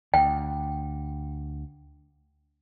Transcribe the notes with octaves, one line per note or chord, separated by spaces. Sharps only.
D2 G5